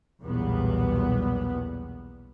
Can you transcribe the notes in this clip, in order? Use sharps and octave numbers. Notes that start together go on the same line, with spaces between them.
B1 E2 A#2 G3 B3